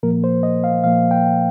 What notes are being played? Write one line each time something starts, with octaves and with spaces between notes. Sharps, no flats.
A#2 F3 A#3 A#4
C5
D#5
F5
A#2 F3 A#3 F5
G5